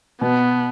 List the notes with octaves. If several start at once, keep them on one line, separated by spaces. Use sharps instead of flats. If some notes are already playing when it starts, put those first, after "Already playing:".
B2 B3